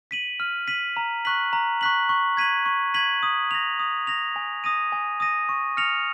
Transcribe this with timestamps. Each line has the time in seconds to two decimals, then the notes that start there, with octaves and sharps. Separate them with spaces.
0.11 B6 D#7 F#7
0.40 F6
0.68 B6 D#7 F#7
0.97 A#5
1.25 C#6 F#6 B6 F#7
1.53 A#5
1.81 C#6 F#6 B6 F#7
2.09 C#6
2.37 G#6 B6 D#7 F#7
2.66 C#6
2.94 G#6 B6 D#7 F#7
3.23 D#6
3.51 A#6 F7
3.79 D#6
4.07 A#6 F7
4.36 G#5
4.64 D#6 A#6 D#7
4.92 G#5
5.20 D#6 A#6 D#7
5.49 C#6
5.77 F6 A#6 C#7 F7